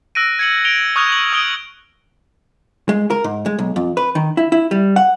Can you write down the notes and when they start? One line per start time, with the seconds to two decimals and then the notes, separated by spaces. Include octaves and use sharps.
0.15 E6 F#6 A#6 D7 D#7
0.39 G#6 C#7 F#7
0.65 D7 F7 G7
0.96 C#6 D#6 F6 F#6 G#6 F7
1.12 F#7
1.32 D#6 G#6 D7 G7
2.89 G#3
3.10 A#4
3.24 G#2
3.46 G#3
3.59 B1
3.76 F2
3.97 B4
4.15 D#3
4.37 E4
4.52 E4
4.71 G3
4.96 F#5